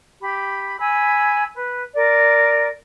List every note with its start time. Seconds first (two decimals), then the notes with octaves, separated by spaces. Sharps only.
0.21 G4 B5
0.78 G#5 B5 E6
1.54 B4
1.95 A#4 D5